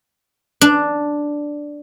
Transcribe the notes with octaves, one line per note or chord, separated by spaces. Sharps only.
D4